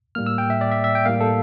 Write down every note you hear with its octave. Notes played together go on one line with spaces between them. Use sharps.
A2 G3 A#3 F6
E6
G5
E5
D5
E5
E5
G5
A2 G3 A#3 F5
A4